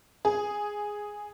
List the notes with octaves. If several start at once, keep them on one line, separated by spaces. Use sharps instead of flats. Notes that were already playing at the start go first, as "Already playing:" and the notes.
G#4